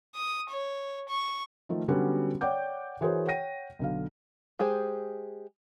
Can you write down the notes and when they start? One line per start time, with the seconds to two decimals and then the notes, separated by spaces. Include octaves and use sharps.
0.15 D#6
0.50 C#5
1.09 C#6
1.69 D#3 F3 A3
1.88 D3 F#3 G3 B3 C#4 F#4
2.41 C#5 D5 F#5 G5 D6 G6
3.01 E3 F#4 G#4 A#4 C5 C#5
3.27 C#5 F#5 G5 A#6 D#7
3.79 B1 D3 F5
4.59 G#3 G4 G#4 C5